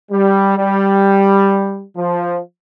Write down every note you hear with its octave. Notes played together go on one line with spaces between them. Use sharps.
G3
G3
F3